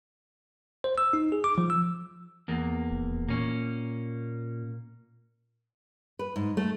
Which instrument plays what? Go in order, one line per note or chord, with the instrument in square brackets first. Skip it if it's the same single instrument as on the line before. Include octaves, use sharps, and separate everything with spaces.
[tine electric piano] C5
E6
D#4
G#4
D6
F3
E6
[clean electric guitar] E2 A#3
[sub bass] D#1
[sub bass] A#2 [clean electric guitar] A#3 C#4
[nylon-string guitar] B4
G#2
A3